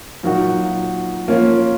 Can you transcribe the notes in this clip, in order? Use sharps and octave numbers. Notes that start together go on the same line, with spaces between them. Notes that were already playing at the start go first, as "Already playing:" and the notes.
A#2 F#3 A#3 D#4 F#4
F3 A#3 C#4 F4